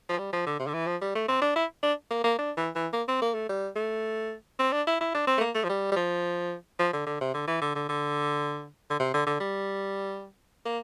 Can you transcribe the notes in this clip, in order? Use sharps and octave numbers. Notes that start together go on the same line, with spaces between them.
F3
G3
F3
D3
C3
D3
E3
F3
G3
A3
C4
D4
E4
D4
A#3
A#3
D4
E3
E3
A#3
C4
A#3
A3
G3
A3
C4
D4
E4
E4
D4
C4
A3
A#3
A3
F3
G3
G3
F3
F3
D3
D3
C3
D3
E3
D3
D3
D3
D3
C3
D3
D3
G3
A#3